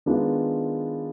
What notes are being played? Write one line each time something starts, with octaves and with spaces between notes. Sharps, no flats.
D#3 G#3 B3 D4 F4